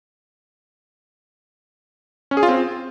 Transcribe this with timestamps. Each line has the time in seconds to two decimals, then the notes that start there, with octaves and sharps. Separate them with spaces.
2.31 C#4
2.37 G#4
2.43 F4
2.49 C4